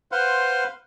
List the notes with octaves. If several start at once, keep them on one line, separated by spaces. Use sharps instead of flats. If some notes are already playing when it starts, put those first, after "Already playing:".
B4 C5 F5 F#5 C6